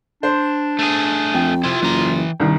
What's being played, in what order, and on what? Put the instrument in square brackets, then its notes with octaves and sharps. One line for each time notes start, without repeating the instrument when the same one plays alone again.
[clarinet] D4 [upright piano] C5
[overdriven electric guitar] A3 G#4
[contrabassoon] F2 [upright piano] G5
[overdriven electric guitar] C3 E4 [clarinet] F4
[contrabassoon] F#1 [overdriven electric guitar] E3 A#5
[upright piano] C2 D#3 [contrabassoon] G2